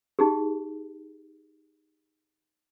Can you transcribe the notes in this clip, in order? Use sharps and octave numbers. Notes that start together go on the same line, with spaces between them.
D#4 G4 G#4